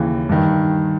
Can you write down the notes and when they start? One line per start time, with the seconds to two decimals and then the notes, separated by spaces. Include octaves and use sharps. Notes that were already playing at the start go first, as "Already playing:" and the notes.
Already playing: D#2 C#3 E3
0.29 G2 D#3